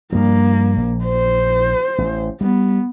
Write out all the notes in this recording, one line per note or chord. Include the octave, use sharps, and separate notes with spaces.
G2 F3 A#3
A#1
C5
A1
G3 B3